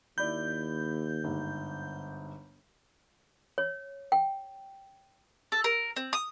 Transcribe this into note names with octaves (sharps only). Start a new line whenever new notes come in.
D#2 E4 D5 B5 G6
G1 G#2
C#5
G5
A4
A#4
C4
D#6